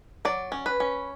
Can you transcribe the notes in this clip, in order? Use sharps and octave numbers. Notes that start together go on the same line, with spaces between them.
F#3 D5
C#4
B4
C#4